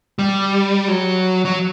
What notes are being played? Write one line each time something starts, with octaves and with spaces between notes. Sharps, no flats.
G3
F#3
F#3